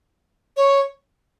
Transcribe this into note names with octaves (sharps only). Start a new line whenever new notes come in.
C#5